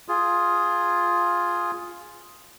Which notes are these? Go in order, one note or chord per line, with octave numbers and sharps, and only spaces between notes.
F4 G#4